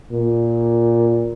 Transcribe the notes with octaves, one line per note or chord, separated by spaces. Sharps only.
A#2